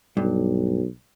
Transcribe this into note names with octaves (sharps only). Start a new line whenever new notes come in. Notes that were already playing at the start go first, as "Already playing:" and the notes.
B1 G2